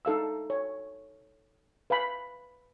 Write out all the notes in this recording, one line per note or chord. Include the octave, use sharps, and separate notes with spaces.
D#4 A4 F5 E6
C#5
B4 F5 G#5 B5